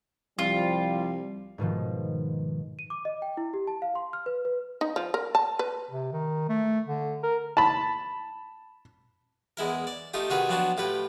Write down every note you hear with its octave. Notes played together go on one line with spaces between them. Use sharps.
C2 F3 G3 F4
G#2 B2 D#3 F3
D#7
D6
D#5
G5
E4
G4
A5
F5
C6
F6
B4
B4
D#4
F3
A#4
A5
B4
C3
D#3
A3
D3
A#4
A5 B5
E2 G#3 E4 A#4
D5
A3 D#4 F4 G4 D#6
C3 D#3 F4 F#4 G#4 B4
F3 F#3 B3 C4 D4 F#4
A2 F4 G4 B4